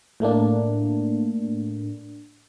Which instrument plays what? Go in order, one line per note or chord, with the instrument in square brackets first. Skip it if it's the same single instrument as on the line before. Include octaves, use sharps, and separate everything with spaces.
[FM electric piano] A2 A3 A#3 D4